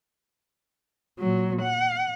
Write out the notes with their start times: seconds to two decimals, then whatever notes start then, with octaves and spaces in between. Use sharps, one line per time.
1.19 A#2 F#3
1.62 F#5